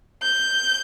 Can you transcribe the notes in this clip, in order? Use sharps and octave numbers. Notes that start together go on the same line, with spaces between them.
G6